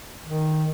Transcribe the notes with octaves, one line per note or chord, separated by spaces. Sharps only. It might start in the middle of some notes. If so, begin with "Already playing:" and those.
D#3